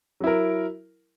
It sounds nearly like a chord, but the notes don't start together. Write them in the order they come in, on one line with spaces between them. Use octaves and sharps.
F#3 E4 A#4